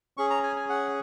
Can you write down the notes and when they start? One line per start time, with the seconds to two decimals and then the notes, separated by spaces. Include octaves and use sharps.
0.17 C#4 G#4 C#6
0.30 A#5
0.43 G#5
0.56 G#5
0.69 F#5